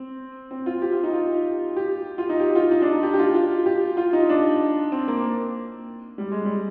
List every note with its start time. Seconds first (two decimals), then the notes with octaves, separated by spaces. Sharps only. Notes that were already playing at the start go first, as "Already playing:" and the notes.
Already playing: C4
0.51 C4
0.66 F4
0.82 G4
0.93 F4
1.04 D#4
1.13 F4
1.76 G4
2.18 F4
2.29 D#4
2.40 G4
2.55 F4
2.71 D#4
2.82 D4
2.92 D#4
3.03 G4
3.13 G4
3.19 F4
3.34 F4
3.66 G4
3.97 F4
4.13 D#4
4.29 D4
4.92 C4
5.08 A#3
6.18 G3
6.32 G#3
6.45 G3